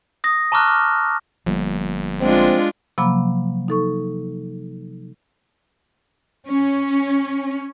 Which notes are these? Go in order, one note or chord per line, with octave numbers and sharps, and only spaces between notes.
D#6 A#6
A5 A#5 C#6 D6 F6 F#6
F6
G1 F3 G3 A#3
G#3 C4 D4 F4
C3 F3 F#3 A#3 B5 D6
D#4 A4 C#6
C#4